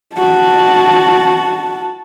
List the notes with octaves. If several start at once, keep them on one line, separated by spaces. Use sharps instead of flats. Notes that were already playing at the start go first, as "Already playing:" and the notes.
F#4 A5